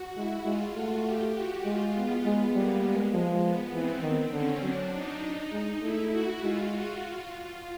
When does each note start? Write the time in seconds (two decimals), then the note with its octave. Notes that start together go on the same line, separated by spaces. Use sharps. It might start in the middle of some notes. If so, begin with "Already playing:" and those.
Already playing: F#4
0.16 G#3 E4
0.45 G#3 F4
0.75 A3 F#4
1.05 G4
1.35 F#4
1.64 G#3 F4
1.95 B3
2.25 G#3 B3
2.54 G3 A#3
2.84 G#3
3.14 F3
3.44 B3
3.74 E3 C4
4.03 D#3
4.33 D3 C#4
4.63 F#3 D4
4.93 D#4
5.52 G#3
5.82 A3 E4
6.12 F#4
6.42 G#3 F4
6.72 F#4
7.01 F4
7.31 F4